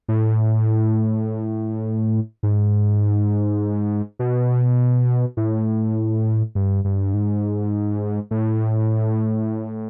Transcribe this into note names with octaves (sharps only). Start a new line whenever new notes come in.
A2
G#2
B2
A2
G2
G2
G#2
A2